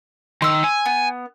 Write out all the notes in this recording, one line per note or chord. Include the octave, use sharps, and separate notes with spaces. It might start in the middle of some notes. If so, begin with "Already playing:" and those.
D#3 C6 E6
G#5
B3